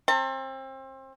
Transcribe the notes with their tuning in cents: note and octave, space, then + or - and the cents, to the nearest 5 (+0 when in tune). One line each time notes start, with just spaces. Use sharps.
C4 +30 A5 +45